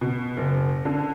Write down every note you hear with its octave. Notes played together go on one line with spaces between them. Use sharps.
B2
F#1
D3